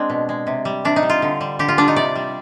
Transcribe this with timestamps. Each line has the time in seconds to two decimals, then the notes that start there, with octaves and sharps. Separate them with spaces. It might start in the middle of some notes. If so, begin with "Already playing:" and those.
Already playing: G#3 C4 D4
0.10 B2
0.29 G#3
0.47 C3
0.65 G3
0.85 C3 D4
0.96 D#4
1.03 G3
1.10 F4
1.22 D3
1.41 G3
1.59 D3 G4
1.68 F4
1.78 G3 D4
1.88 D#4
1.96 C3 D5
2.16 G3